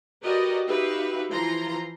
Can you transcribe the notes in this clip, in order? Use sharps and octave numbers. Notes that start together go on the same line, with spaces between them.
F#4 G4 A#4 B4 D5 D#5
D#4 F#4 G4 B4 E5 F5
E3 F3 F4 A#5 C6